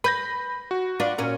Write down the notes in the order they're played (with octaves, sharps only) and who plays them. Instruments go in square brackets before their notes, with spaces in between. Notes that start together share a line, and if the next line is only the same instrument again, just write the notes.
[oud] B4 [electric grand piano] B5 G6 A#6
[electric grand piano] F#4
[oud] D4 F4 B4
A#2 C#4 A#4